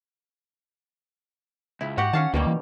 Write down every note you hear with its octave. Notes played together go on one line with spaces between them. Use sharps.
C#2 E4
G#2 F#4 G4 F#5
D#3 C#4 F5 A5
D2 B2 D#3 G3 A#3
E3